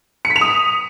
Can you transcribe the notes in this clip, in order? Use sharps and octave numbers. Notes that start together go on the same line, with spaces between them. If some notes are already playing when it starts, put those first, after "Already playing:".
C#7
B6
F7
D#6